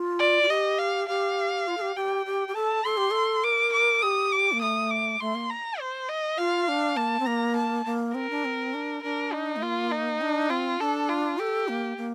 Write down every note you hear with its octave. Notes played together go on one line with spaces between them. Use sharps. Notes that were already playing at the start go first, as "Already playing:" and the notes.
Already playing: F4
D5
F4
G4 D#5
F5
G4 F5
F4
A4
G4
G4 G5
G4
G4
A4 A5
A4 C6
G4
A4
A#4 D6
D6
G4 D#6
D6
A#3
A3 D#6
D6
A3 C6
A#3
A#5
C5
D#5
F4 F5
D4
A#3 A5
C4
A#3 A#5
A5
A#3
C4 A#4
D4
C4
D4
D4 A#4
D#4
A3
A#3 F4
D#4
D4
C4 F4
D4 A4
F4
G4 A4
A#3
A#3